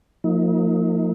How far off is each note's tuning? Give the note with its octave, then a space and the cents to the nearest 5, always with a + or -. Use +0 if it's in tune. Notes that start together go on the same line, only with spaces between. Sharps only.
F3 +15 A#3 -35 D#4 +35